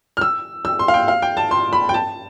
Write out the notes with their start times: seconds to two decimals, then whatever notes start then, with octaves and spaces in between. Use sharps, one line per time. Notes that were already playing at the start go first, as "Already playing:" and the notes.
0.17 F6
0.21 E6
0.65 E6
0.79 C6
0.88 F5
0.94 G5
1.08 F5
1.22 G5
1.37 A5
1.51 C6
1.73 B5
1.89 G5
1.94 A5